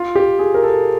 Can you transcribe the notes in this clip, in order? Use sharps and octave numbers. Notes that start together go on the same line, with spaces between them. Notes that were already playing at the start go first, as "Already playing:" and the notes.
Already playing: F4
G4
G#4
A#4
A4